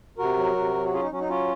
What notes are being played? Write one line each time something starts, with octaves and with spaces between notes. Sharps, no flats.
C3 F#4 A#4
F#3
C3
F#3
F#4
C#4 F4 G#4
D#4
F#3 C#4
D#4
C#4 F4